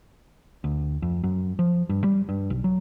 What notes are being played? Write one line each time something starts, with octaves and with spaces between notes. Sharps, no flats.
D2
F2
F#2
F3
G2
G3
G2
B1
F#3